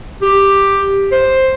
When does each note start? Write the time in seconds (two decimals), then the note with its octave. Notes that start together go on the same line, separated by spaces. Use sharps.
0.22 G4
1.12 C5